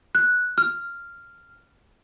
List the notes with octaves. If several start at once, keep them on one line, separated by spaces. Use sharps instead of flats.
F#6
F6